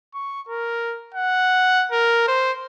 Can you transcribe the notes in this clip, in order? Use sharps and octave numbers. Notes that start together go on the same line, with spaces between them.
C#6
A#4
F#5
A#4
C5